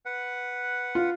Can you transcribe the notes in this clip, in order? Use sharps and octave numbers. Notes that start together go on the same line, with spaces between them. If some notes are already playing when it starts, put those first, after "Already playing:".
B4 F#5
F4